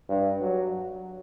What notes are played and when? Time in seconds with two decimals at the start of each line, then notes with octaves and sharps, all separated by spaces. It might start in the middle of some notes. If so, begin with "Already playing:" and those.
0.09 G2
0.41 F#3